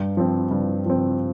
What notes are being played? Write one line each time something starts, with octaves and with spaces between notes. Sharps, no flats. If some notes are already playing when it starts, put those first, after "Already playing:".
Already playing: G2
F3 C4
G2
F3 C4